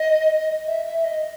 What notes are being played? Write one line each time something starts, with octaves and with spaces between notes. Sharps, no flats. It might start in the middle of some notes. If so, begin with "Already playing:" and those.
Already playing: D#5
E5
E5
D#5